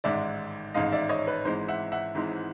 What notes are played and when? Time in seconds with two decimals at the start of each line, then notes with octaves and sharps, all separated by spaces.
0.04 A1 G#2 D#3 G#3 D5 E5
0.74 A1 G#2 D#3 G#3 D#5 F5
0.92 D5 E5
1.09 C#5 D#5
1.27 B4
1.45 G#1 G#2 E3 G#3 C5
1.68 E5 F#5
1.92 E5 F#5
2.15 G#1 G#2 E3 G#3